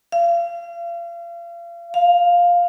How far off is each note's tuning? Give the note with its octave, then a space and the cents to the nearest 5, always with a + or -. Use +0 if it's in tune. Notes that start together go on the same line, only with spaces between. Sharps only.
F5 -35
F5 +5